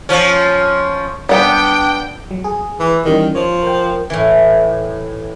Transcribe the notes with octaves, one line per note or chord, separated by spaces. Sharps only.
F3 C#4
G3 B3 D4 G5
F#3
G#4
E3
D#3 E3 G3 C#4
F3 C#5
A#4 G5
A2 E3